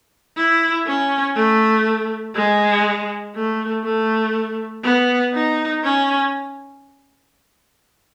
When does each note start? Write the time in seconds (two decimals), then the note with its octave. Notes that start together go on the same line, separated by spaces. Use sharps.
0.36 E4
0.87 C#4
1.35 A3
2.35 G#3
3.35 A3
3.84 A3
4.83 B3
5.33 D#4
5.83 C#4